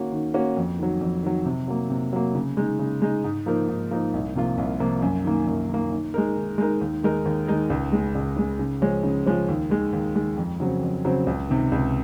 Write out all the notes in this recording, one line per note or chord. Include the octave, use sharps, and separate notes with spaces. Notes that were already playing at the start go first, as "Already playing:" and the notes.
Already playing: D#3 A#3 C#4 F#4
D#3
A#3 C#4 F#4
F2
D#3 F#3
F2
D#3 F#3
C3
F#3 A#3
C3
F#3 A#3
C#3
G#3 D#4
C#3
G#3 D#4
G#2
F3 A#3 D#4 A#4
G#2
F3 A#3 D#4 A#4
C2
C3 F3 A#3 F4
C2
C3 F3 A#3 F4
F#2
D#3 A#3
F#2
D#3 A#3
D#3
G#3 D#4 A#4
D#3
G#3 D#4 A#4
D#2
D#3 G#3 D#4 A#4
D#2
D#3 G#3 D#4 A#4
C#2
C#3 G#3
C#2
C#3 G#3
C#3
F3 G#3 C#4
C#3
F3 G#3 C#4
D#2
D#3 G#3
D#2
D#3 G#3
F2
C#3 F#3 C4
F2
C#3 F#3 C4
C#2
C3 D#3
C#2